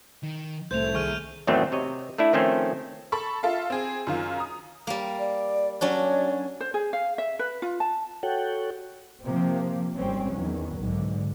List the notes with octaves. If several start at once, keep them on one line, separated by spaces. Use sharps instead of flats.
D#3
C2 A2 C3 A3 C5 G6 G#6 F7
D#2 D4 G#4 C#6 F6 D#7
E2 A2 D#3 F#3 A3 C4
C3 C#5 D#5
A3 D4 E4
D#3 F3 A3 C4 C#4 C5
A4 B5 C#6
F4 A4 E5 F5
C4 G#4
F#2 D#3 F4
A#5 D#6
G3 A#3
D5
F#3 C#4 D4 D5
C5
G#4
F5
E5
B4
F4
A5
F#4 A4 C#5 F#5 G5
C3 F3 A#3 C4
G#1 G3 C4 C#4
E2 D#3 F#3
B1 G#2 D3